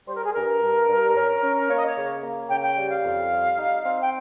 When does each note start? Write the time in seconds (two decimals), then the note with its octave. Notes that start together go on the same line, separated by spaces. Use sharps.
0.08 G3 C5
0.17 A#4
0.26 G#4
0.35 G2 A#4
0.62 G2
0.89 G2
1.16 C#4
1.43 C#4
1.69 A#3 C#5
1.78 D#5
1.87 C#5
1.96 C#3
2.23 A#3
2.50 C#3 G5
2.65 G5
2.78 G3
2.91 F5
3.04 F2
3.32 G3
3.58 D#4
3.85 C4
4.03 G5